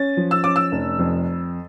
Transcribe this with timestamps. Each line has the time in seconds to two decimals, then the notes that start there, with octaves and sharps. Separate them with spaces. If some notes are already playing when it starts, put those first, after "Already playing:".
Already playing: C#4 A6
0.17 F3
0.31 E6
0.44 C#4 D6
0.56 E6
0.72 F1
0.99 F2